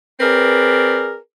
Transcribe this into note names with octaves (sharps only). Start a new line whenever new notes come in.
C4 G#4 A#4 B4 D5